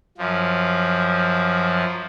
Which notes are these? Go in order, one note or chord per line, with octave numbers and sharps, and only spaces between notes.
F#2 F3